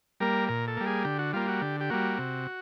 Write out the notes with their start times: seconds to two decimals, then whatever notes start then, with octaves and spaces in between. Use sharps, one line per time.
0.20 G3 A#3 A#4
0.49 A#2 A#4
0.68 A4
0.77 G3 A#3
0.86 G#4
1.05 D3 G4
1.19 F#4
1.33 G3 A#3 F4
1.48 F#4
1.62 D3 G4
1.80 G4
1.90 G3 A#3 F#4
2.19 C3